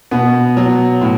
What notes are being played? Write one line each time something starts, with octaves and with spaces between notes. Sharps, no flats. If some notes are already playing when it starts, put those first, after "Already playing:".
B2 B3
F#3
A2